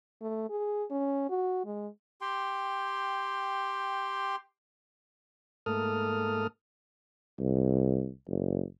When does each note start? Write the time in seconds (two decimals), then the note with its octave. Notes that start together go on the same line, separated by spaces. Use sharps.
0.21 A3
0.50 G#4
0.91 C#4
1.30 F#4
1.65 G#3
2.21 G4 G5 C6
5.66 G#2 A3 A#3 A4 D#6 F6
7.40 C2
8.28 F#1